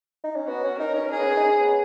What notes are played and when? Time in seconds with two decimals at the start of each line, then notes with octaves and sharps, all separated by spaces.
0.24 D#4
0.36 C#4
0.47 B3 F#4
0.64 C#4
0.79 D#4 A#4
0.95 C#4
1.11 D#4 G#4
1.19 B3
1.27 C#4
1.37 D#4
1.43 C#4
1.60 B3